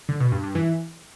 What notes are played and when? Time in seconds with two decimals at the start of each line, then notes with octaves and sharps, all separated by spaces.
0.09 D3
0.20 B2
0.32 G2
0.44 G2
0.55 E3